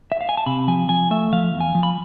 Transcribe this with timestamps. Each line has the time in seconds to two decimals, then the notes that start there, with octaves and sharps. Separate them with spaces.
0.12 E5
0.21 F5
0.29 G#5
0.37 A5
0.46 C3 B5
0.68 F3 G#5
0.89 F3 G#5
1.11 A3 E5
1.32 F3 F5
1.54 E2
1.60 G#5
1.75 F3
1.83 B5